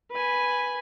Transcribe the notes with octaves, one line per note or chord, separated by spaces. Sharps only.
B4 G#5